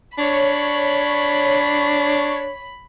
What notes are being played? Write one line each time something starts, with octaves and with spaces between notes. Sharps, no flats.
D4 C#5 B5